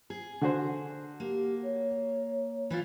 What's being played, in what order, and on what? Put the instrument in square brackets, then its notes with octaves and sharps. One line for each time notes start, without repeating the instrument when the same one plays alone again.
[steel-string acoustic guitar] G#4
[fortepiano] D3 F#4 C5
[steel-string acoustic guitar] A#3 [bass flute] G4
[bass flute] C#5
[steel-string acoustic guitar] E3 E4 F4